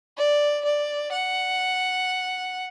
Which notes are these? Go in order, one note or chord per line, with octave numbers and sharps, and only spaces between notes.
D5
D5
F#5